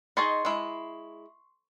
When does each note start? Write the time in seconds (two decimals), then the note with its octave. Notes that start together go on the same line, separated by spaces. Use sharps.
0.17 D#4 G#4 D#5 C6 C#6 A6
0.45 G#3 E4